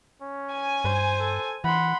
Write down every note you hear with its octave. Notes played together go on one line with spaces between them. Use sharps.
C#4
G#5
G2 C5
A4
E3 F#5 B5 C6